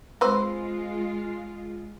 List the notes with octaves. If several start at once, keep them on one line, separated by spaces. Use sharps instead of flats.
G#3 C4 F4 B4 C5